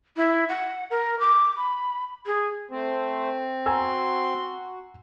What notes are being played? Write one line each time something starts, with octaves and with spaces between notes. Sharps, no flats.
E4
F#5
A#4
D6
B5
G#4
A3 C4 C5
F#4 G#5 A#5 C6 E6